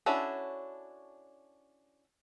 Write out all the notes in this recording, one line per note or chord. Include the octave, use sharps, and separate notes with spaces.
C#4 D4 E4 F#4 A4